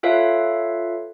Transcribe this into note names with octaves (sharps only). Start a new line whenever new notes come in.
F4 A4 B4 C#5 E5 F5